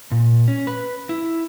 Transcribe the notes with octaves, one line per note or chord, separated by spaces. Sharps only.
A#2
C#4
B4
E4